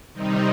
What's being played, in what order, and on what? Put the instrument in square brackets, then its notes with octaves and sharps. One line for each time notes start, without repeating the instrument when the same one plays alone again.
[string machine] C3 D#3 G3 C4 D#4